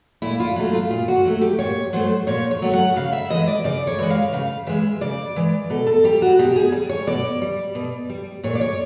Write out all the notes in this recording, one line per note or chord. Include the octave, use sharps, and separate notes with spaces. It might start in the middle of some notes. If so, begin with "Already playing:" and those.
A#2 E4
F4
F#3 A3 F4
F4
A#2 F4
F#4
F#3 A3
G4
A#2 C#5
F#3 A3 C5
A#2 C#5
C#5
F#3 A3
F#5
C#3 F5
E5
E3 G#3 D#5
D5
C#3 D5
C#5
E3 G#3
F5
C#3 F5
E3 G#3 E5
C#3 D5
E3 G#3
B2 A4
A4
G3 G4
F#4
B2 G4
G#4
G3
C#5
B2 D5
G3
B2
G3
A#2 C#5
D5
C#5